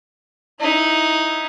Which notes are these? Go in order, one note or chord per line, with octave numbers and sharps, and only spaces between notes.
D#4 E4